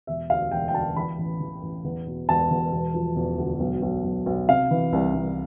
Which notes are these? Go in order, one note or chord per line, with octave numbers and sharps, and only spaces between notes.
E1 E5
D2 F5
E1 G5
G5
D2 A5
E3 B5
A1
E3
A1
E2
B2
E1 A5
E2
E1
F3
E1
D2
B1
B1
B1
B1
C3 F5
E3
C2
C2